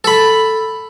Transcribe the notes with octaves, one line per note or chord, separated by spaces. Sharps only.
A4 B5